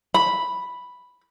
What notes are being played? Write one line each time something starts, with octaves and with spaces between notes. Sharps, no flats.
B5